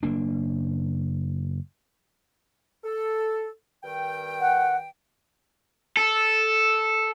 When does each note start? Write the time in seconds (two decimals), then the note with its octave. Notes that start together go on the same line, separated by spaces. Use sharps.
0.03 F#1 A#3 D4
2.84 A4
3.84 G2 D#3 G5
4.41 F#5
5.97 A4